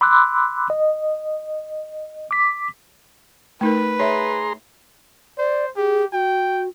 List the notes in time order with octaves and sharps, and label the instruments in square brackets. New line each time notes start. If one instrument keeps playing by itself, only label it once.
[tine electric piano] B5 C6 D6 E6 F#6
D#5
D6 B6
[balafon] A3 D#4 A#4 [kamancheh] B4
[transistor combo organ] G#4 A#5 C6 [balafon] C#5 E5
[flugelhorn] C5 [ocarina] D5
[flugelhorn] G4 [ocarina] G#4
[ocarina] F#4 [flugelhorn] G5